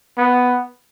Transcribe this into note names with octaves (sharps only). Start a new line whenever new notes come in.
B3